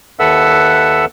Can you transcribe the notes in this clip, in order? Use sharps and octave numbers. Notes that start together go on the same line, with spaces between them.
D#2 A4 B4 E5 F#5 E6